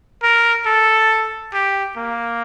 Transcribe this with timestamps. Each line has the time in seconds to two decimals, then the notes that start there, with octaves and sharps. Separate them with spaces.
0.23 A#4
0.66 A4
1.53 G4
1.97 A#3